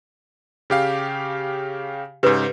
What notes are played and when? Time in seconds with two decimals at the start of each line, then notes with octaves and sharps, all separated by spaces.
0.70 C#3 G4 F5
2.23 G#2 C#3 G4 A4 B4